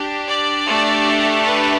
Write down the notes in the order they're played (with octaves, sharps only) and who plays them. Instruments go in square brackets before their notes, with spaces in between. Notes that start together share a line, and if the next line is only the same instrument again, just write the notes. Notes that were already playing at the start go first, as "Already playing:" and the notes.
Already playing: [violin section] D4 G4
D5
A3 D4 G4
B4